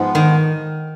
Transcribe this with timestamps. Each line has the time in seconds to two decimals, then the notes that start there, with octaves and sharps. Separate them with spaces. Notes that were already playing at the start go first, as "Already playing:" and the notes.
Already playing: G#2 F3 G#3 B3
0.15 D#3